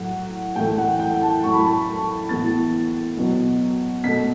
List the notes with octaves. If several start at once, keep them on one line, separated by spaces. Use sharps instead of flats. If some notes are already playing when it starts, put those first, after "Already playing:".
Already playing: A2 F#3 A3 F#5
A2 E3 A3 G5
F#5
G5
A5
A2 F#3 A3 C#6
B5
A5
B5
A2 E3 B3 A6
B2 F#3 B3
B2 A3 B6